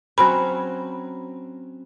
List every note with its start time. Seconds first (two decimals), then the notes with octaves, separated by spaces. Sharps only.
0.18 F#3 C4 C#4 B5